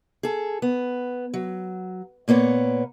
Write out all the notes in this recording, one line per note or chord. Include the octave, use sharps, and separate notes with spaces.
G#4 A4
B3
F#3
A#2 A#3 B3 C#5